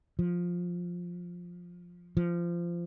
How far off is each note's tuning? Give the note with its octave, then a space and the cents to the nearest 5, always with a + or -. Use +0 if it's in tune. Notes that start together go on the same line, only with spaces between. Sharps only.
F3 +10
F3 -20